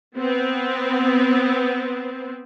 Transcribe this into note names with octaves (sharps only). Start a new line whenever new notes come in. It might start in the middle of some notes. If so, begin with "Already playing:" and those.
B3 C4